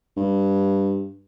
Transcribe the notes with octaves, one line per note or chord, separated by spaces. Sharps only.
G2